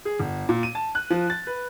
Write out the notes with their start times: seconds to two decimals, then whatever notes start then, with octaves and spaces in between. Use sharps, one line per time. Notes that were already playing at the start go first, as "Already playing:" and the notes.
0.05 G#4
0.20 G1
0.49 A#2
0.63 D#7
0.75 A5
0.95 F#6
1.10 F3
1.30 A6
1.47 B4